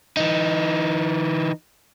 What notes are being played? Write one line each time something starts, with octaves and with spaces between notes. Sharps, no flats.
E3 D#4